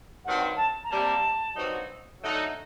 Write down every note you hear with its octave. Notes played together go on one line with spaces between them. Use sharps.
G2 D#3 F#3 C4 F#5
A5
A#5
C3 G3 A#3 A5
G2 F#3 C4 D#4 F#4
D3 F#3 A3 D#4 F#4